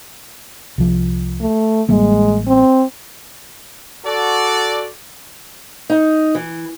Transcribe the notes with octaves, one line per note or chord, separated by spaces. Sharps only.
C2 F3
A3
A1 G3 G#3 A#3
C4
F#4 A4 D5
D#4
E3